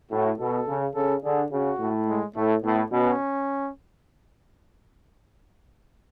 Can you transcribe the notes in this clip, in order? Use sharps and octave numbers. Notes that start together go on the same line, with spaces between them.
A2 F#4
B2 A4
C#3
C#3 A4
D3 G#4
C#3 F#4
A2
G#3
A2 A3
A2 B3
B2 C#4